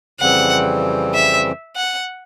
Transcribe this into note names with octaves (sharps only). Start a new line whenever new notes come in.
F2 C#3 E3 G3 C4 F#5
E5
F#5